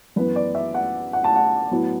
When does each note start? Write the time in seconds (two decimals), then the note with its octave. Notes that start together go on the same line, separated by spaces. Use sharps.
0.16 F#2 E3 B3 B4
0.36 D5
0.55 E5
0.74 F#5
1.13 F#5
1.24 A5
1.36 F#5
1.71 A2 F#3 B3